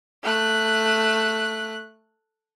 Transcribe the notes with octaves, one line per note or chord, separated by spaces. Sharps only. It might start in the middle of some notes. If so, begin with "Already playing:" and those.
A3 F#6